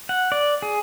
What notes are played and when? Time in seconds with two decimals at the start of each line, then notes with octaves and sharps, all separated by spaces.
0.09 F#5
0.32 D5
0.62 G#4